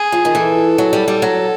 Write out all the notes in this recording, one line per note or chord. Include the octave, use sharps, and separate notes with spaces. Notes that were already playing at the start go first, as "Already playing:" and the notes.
Already playing: G#4
F3
D#3
E3 A4
F#3
G3
G3
F#3